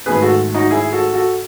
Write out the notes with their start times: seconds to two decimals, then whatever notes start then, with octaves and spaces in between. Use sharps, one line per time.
0.06 G#2 D#3 F#3 A3 G#4 B4
0.22 F#4 A4
0.54 D#4 F#4
0.70 E4 G#4
0.92 F#4 A4
1.14 F#4 A4